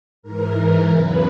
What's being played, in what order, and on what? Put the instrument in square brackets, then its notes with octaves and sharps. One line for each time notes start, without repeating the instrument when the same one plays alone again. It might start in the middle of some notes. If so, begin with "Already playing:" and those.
[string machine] G#2 E3 A#4
E2 C#3 F#3 B4